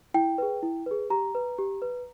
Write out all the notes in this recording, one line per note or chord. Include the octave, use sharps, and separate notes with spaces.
E4 G5
G#4 B4
E4
G#4 B4
G4 A#5
B4
G4
B4